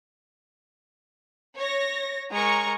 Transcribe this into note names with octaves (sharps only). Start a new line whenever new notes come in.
C#5 A#6
G#3 A#4 A#5 C#6